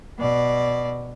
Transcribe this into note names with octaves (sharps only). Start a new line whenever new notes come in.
B2 D5